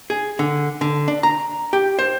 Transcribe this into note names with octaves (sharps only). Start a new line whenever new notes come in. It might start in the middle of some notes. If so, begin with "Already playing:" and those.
G#4
D3
D3
D4
A#5
G4
C5